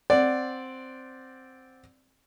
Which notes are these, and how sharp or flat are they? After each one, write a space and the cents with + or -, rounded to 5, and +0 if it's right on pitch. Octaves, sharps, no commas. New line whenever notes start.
C4 +0 D5 +0 F#5 -5